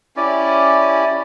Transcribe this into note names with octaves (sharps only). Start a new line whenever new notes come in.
C#4 E4 G4 D5